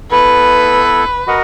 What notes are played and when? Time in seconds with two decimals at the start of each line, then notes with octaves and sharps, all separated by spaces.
0.11 B3 E4 A4 B4
1.27 F#4 A#4 D#5 F#5